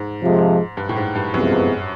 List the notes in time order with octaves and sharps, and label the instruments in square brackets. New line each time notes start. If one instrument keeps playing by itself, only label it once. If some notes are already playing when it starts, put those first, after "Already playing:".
Already playing: [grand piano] G#2
[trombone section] F2 C3 F3 G#3
[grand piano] G2
A2
G#2
G2
[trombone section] C2 C3 F3 G#3 B3 [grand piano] F#2
[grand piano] G2